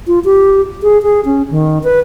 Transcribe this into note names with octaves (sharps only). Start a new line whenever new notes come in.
F4
G4
G#4
G#4
C#4
D#3
B4